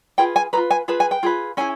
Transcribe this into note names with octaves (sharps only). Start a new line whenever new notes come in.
F4 G#4 B4 G5
G#5
F4 G#4 B4 A#5
G#5
F4 G#4 B4 A5
G#5
G5
F4 G#4 B4
C#4 E4 G#4 G#5